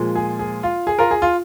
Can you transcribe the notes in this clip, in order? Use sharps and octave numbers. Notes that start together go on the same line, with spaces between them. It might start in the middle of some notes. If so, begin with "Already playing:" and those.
Already playing: A#2 F3 G#3
G#4
G#4
F4
G#4
F4 A#4
G#4
F4